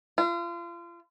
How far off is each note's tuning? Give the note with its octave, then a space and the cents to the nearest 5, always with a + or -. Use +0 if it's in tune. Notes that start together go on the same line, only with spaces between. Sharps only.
F4 -35